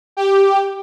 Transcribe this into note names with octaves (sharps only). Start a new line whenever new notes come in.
G4